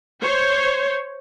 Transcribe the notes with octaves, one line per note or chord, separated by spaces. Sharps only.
C5 C#5